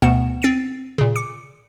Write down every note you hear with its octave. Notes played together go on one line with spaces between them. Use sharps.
D2 B2 B3 F#5 E7
C4 A6 C7 D7 D#7
A#2 C#3
D6 C#7